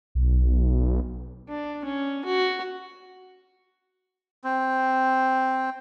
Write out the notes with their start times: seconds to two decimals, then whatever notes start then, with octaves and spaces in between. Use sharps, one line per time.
0.15 B1
1.48 D4
1.85 C#4
2.25 F#4
4.44 C4